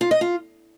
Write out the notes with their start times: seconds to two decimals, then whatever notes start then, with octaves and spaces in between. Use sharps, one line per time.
0.01 F4
0.11 D#5
0.21 F4